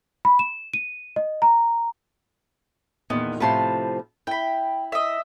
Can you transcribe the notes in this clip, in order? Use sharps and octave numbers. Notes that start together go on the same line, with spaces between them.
B5
E7
D#7
D#5
A#5
E2 A#2 D#3 B3
A2 C3 F3 B4 A5 C6
E4 G5 B5
D#5 E5